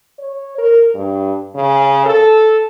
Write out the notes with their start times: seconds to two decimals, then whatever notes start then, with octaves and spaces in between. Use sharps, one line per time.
0.19 C#5
0.58 A#4
0.95 G2
1.56 C#3
2.06 A4